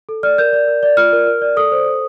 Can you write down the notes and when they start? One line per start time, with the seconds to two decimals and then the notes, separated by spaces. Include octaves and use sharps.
0.09 A4
0.23 D5 F6
0.38 A#4 G6
0.53 D5
0.68 A#4
0.83 D5
0.97 F4 F6
1.13 A#4
1.27 A#4
1.42 D5
1.57 A4 D#6
1.72 C5
1.87 A4